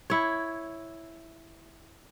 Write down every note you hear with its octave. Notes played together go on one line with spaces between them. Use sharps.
E4 C#5